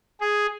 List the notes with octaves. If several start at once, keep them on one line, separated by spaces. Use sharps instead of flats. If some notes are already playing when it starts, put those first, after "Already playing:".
G#4